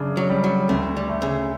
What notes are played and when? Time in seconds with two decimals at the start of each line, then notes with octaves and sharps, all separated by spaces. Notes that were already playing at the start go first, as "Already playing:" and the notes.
Already playing: F#2 C#3 D4
0.17 F#3
0.30 G3
0.44 F#3
0.69 D2 A3
0.97 G3
1.09 A3
1.22 C#3